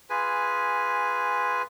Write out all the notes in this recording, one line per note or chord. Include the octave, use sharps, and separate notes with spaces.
F4 G#4 B4 G#5